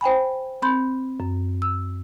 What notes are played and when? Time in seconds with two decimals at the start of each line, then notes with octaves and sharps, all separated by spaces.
0.01 C5 G5 G#5 B5
0.62 C4 B5 C6 G6
1.20 F#2
1.62 E6